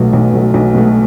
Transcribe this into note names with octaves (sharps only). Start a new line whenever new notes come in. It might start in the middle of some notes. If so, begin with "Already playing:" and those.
Already playing: B1 B2 F#3 A3
B1
B2 F#3 A3
B1
B2 F#3 A3